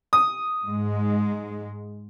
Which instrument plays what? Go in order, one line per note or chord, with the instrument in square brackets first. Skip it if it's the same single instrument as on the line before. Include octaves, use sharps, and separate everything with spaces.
[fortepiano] D#6
[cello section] G#2 G#3